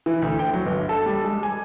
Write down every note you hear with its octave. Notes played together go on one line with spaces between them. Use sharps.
E3
D2
G5
F#3
G1
A4
G3
G#3
G#5